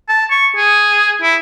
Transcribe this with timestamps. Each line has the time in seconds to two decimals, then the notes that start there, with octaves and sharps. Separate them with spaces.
0.09 A5
0.31 C#6
0.56 G#4
1.22 E4